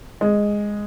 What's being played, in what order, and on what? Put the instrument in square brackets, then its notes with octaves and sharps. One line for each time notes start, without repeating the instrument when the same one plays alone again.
[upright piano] G#3